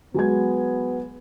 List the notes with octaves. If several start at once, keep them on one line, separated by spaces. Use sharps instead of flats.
F#3 G#3 B3 G#6